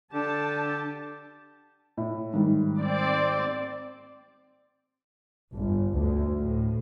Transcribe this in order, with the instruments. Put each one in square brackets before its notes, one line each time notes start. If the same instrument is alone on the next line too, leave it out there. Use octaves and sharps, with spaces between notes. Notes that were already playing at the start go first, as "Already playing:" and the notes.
[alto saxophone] D3 [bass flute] D4 [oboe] G4 [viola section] A5
[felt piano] A2
G#2 D#3 G3
[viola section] C4 D5
[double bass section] G1
D2
A2